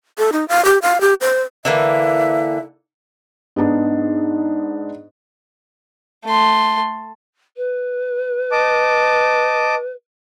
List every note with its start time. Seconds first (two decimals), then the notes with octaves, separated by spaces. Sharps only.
0.18 A4
0.32 D#4
0.48 F5
0.65 G4
0.82 F5
1.01 G4
1.21 C5
1.65 D3 E3 A#3 E5
3.56 G#2 B3 D4 D#4
6.25 A3 C6
7.57 B4
8.52 D#5 A5 D6